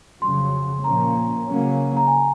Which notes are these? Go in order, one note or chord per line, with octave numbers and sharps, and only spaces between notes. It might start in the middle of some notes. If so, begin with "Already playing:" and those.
F2 C#3 F#3 C6
A#2 F3 A#3 C#4 A#5
C#3 F#3 A#3 C#4
A#5
G#5